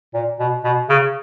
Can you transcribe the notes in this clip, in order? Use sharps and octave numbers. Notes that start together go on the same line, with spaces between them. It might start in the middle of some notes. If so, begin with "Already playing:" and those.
A#2
B2
B2
C#3